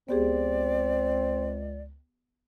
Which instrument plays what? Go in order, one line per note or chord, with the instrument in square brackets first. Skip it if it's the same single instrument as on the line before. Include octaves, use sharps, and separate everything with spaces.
[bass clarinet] C#2 [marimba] B3 G4 G#4 [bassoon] C4 [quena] D5